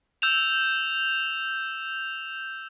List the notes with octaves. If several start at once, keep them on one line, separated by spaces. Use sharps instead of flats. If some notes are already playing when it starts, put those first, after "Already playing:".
E6 G6 E7 F7